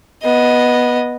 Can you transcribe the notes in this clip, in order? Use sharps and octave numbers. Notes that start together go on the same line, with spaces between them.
B3 D#5